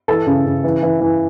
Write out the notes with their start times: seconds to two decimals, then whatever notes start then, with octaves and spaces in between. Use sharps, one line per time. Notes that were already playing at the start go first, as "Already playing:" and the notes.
0.08 E3 A4 A5
0.27 C#3
0.46 C#3
0.64 E3
0.83 E3
1.01 E3